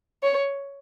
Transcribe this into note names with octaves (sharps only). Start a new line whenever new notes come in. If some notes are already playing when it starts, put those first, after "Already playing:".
C#5